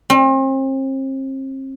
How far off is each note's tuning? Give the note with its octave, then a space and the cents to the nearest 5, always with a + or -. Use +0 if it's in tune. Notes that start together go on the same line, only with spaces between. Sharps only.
C4 +40